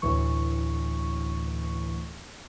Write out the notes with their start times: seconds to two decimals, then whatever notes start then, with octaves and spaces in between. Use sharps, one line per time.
0.02 D2 A2 E3 C#6